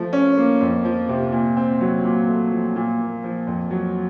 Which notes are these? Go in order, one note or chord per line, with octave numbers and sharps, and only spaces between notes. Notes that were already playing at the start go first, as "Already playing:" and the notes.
Already playing: F3 A3
C#4
A#3
F2
F3
C3
A#2
C4
F#3
A#2
A3
F3
A#2
A#3
F3
F2
F#3